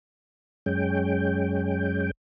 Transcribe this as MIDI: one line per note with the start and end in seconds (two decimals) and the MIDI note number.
0.66 2.11 42
0.66 2.11 56
0.66 2.11 61
0.66 2.11 79